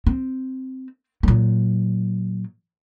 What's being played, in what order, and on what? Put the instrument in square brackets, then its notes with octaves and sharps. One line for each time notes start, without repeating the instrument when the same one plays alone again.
[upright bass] C4
A#2 F#3